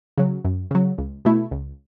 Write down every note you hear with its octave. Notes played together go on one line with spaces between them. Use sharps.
C#3 F#3
F#2
C#3 F#3
C#2
B2 A3 E4
C#2